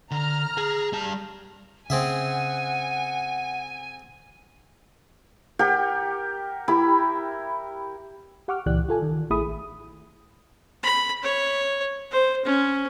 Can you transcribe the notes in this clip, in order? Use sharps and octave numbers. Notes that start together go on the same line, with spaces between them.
D3 A#5 F6
G#4
G3 A5
C#3 C4 G#4 E5 F#5 G#5
G4 A#4 F#5 G5
E4 G4 A#4 B5
G4 F#5 C#6 D6 F6
C#2 A#2 E3 G4 D5 F#6
F4 A4 G#5
D#3
A1 A3 E4 G#4 B5 D#6
B5
C#5
C5
C#4